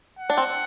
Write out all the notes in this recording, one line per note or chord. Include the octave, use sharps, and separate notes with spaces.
F#5
D4
C4